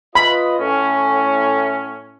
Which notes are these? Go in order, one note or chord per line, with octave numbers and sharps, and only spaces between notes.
F4 B4 D#5 B5
A2 C#4